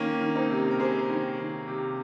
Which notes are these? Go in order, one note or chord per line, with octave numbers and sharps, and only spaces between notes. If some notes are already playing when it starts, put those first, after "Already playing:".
Already playing: D#3 A#3 C#4
D#3
C4 D#4
C3
A#4
C3 G#4 C5
D#3
D#3
C3